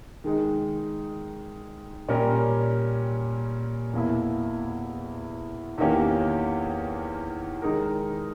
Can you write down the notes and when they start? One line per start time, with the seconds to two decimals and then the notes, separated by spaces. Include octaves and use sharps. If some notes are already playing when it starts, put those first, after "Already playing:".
0.24 D#3 G#3 D#4
2.08 A#2 G3 C#4 G4 A#4
3.93 E2 B2 A#3 E4
5.78 E2 D#3 A#3 C#4 G4
7.62 D#3 G#3 D#4 A#4